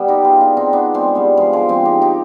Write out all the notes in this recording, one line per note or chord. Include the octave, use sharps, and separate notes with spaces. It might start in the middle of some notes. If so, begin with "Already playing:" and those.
Already playing: G3 B3
D#4 G4
F4 G#4
D4 F4
C4 D#4
B3 D4
G#3 C4
G3 B3
F3 G#3
F3 G#3
G#3 C4
D#4 G4
D#4 G4